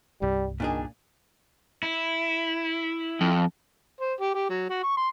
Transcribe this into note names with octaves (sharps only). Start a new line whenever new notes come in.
C2 G2 G3
A#2 D#3 D4 G#4
E4
F2
C5
G4
G4
F#3
F#4
C#6
C6